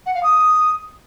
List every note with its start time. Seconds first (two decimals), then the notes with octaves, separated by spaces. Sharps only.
0.06 F#5
0.15 F5
0.23 D#6